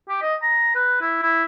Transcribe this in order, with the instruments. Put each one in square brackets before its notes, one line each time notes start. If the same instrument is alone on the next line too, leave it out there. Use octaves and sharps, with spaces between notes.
[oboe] G4
D#5
A#5
B4
E4
E4